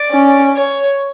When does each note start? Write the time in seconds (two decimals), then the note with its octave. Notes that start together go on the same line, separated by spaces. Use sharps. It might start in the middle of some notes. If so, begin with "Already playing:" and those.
Already playing: D5
0.11 C#4
0.56 C#5